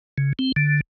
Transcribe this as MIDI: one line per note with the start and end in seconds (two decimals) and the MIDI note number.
0.18 0.33 49
0.39 0.52 60
0.56 0.81 50